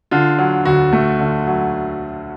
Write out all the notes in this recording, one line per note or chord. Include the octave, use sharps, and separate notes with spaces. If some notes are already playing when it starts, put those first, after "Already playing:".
D3 F4
F#3
D2 F#4
A3
D3
F#3